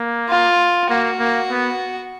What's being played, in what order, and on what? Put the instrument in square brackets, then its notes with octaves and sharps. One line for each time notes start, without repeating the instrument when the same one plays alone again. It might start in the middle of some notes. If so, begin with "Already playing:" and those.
Already playing: [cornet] A#3
[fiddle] F4
[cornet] A#3 [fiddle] F#4
[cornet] A#3
B3